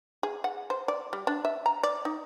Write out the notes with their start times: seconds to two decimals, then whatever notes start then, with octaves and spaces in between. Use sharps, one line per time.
0.23 G#4
0.44 F#5
0.70 C5
0.88 D5
1.13 G3
1.27 D4
1.45 E5
1.66 A#5
1.83 D5
2.05 D#4